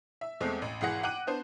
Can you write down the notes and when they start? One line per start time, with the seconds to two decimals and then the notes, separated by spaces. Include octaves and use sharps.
0.21 E5
0.41 E2 G#3 A3 C4
0.62 A1
0.81 G#1 E3 G#4 F#5 A#6
1.03 F#5 G5 D6 F#6 D#7 F#7
1.27 B3 D4 C5